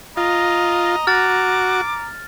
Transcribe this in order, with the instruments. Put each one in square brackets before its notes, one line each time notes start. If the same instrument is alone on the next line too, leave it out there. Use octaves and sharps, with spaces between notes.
[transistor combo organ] F4 [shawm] D#5 [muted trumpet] A#5
[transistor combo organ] F#4 [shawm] D6 [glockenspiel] F6 A6